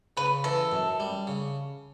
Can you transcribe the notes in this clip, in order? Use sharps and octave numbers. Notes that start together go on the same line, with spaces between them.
C#3 B4
E3 A4
F#2
G3
C#3